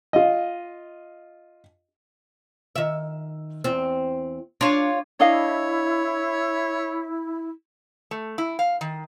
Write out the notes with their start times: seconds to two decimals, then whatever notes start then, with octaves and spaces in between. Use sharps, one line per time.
0.13 F4 D#5
2.76 D#3 E5
3.64 E2 C4
4.61 D4 F4 C#5
5.20 D4 E4 C#5 D#5 F5
8.11 A3
8.38 E4
8.59 F5
8.81 D#3